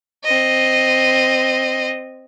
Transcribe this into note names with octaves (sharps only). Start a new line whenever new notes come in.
C4 D#5